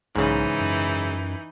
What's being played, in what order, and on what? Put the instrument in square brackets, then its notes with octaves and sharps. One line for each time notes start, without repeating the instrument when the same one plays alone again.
[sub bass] B1 [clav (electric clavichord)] G#2 C#3 [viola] E3 D#4
[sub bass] F#2